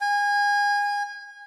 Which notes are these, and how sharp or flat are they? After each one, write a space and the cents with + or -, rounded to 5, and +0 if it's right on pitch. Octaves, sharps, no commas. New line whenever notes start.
G#5 -25